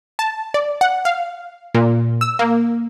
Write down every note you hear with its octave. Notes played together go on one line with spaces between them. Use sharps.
A5
D5
F#5
F5
A#2
E6
A#3